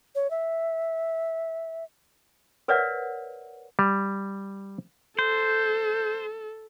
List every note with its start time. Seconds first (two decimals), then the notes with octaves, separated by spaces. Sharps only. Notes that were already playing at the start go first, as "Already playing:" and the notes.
0.15 C#5
0.31 E5
2.68 A#4 B4 C#5 D5 E5 F#5
3.79 G3
5.19 A4 C5